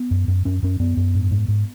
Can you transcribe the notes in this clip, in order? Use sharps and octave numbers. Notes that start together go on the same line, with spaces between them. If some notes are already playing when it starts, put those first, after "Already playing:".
Already playing: B3
F#2
F#2
F#2 C#4
F#2 C#4
F#2 B3
F#2
G#2
G#2
G#2